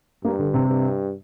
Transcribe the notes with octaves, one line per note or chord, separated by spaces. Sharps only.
G2 A#3
D3
C3
G2